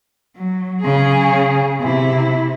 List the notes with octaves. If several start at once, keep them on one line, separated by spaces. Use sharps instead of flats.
F#3
C#3 G#4
C3 E4